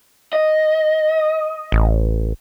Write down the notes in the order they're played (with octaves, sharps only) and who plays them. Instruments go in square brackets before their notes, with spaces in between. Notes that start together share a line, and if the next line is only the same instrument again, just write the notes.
[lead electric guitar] D#5
[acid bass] A1